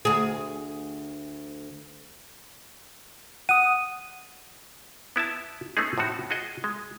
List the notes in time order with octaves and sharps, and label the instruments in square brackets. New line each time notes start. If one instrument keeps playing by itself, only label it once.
[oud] D2 G#4
[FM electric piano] F#5 D#6 [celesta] D#7
[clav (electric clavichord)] B3 E4 E5 A5
A3 B3 C#4 D#4 G#4
A2 F3 C4 D#4 F#4
F4 F#4 G#4 D#5
G#3